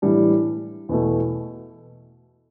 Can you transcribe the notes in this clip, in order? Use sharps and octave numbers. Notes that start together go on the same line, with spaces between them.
A2 E3 G3 D4
E2 B2 A3